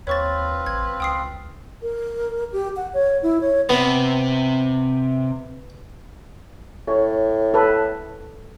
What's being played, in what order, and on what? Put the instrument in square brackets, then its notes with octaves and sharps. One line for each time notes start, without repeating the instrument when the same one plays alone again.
[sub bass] D#2 [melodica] C4 F4 [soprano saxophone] B4 [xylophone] C#5 C#6 A6
[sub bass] A1 [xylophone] G#6
[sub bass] C#2 [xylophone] G5 D#6 C7
[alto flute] A#4
G4
F#5
C#5
E4
C#5
[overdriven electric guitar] C3 [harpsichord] B3
[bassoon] A2 [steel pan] C#5
[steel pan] A4 B4